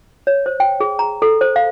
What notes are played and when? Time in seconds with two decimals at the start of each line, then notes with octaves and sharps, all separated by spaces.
0.27 C#5
0.46 C5
0.60 G5
0.80 G#4
0.99 A#5
1.22 A4
1.41 C5
1.56 F5